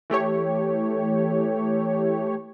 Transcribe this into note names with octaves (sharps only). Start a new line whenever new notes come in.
E3 A3 G4 C#5